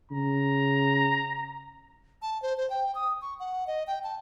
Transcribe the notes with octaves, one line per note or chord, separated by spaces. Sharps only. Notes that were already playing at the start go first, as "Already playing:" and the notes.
C#3 A#5
A5
C5
C5
G5
D#6
C#6
F#5
D#5
G5
A5